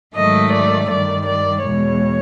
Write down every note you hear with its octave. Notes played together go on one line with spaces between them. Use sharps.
G#2 D#3 F#3 A3 D#5
D5
G2 D#3 G3 D5
D5
E2 B2 G#3 C#5